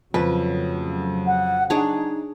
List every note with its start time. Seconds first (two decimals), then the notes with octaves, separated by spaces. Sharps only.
0.14 F2 C#3 F#3 A3 B4
1.26 F#5
1.70 D4 D#4 G#4 C#5